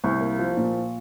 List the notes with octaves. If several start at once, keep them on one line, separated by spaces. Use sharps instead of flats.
C2 C#6
A#3
F3
A#2